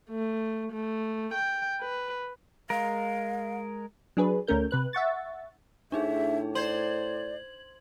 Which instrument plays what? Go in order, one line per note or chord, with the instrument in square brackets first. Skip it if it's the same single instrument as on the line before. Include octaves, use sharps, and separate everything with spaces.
[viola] A3
A3
G5
B4
[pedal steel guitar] G#3 A#4 [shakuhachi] F5
[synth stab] F#3 D4 G#4 B4
D2 A3 C#4 A#4 G6
C3 B4 F#6
E5 F#5 C#6 A6
[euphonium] A2 [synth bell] D4 D#4 G#4 [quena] E5
[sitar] C5 [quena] D5 [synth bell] G#6 F#7